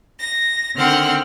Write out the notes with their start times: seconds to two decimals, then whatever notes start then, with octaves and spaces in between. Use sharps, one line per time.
0.18 A#6
0.75 D3 D#3 C4 F#5 F6